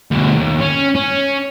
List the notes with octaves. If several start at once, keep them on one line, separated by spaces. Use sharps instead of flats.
D2 B2
D#2
C#4
C#4